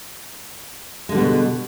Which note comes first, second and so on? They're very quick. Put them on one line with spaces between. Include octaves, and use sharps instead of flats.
G#3 D3 G3 B3 B2